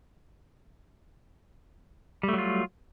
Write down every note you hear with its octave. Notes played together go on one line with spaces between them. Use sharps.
F#3 G3 A3 F4